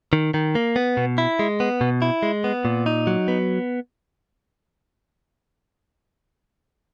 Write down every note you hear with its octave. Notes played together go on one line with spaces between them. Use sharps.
D#3
D#3
A#3
B3
B2
E4
G#3
B3
B2
E4
G#3
B3
A#2
D#4
F#3
B3